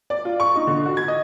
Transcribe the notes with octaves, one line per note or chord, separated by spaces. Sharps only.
D5
F4
C#6
D#4
D3
F#4
G#6
D#5